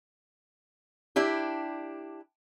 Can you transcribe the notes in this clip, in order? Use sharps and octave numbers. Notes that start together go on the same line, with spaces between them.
D4 E4 G4